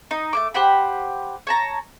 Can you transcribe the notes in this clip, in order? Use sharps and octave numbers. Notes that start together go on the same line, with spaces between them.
D#4
A3 A#3 D6
G4 C5 F#5 B5
C#5 A5 A#5